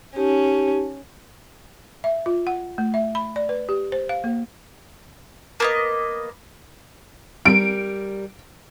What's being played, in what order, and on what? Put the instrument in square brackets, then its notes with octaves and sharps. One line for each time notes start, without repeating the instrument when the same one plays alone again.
[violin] C#4 [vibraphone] D#4 G4 A5
[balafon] E5
F4
F#5
A3
E5
B5
D5
B4
G4
C5
F5
A#3
[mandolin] A#3 B3 D#5
[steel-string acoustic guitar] G3 A#4 [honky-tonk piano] D7